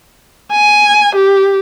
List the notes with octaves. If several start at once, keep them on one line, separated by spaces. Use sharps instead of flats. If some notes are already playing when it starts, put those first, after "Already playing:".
G#5
G4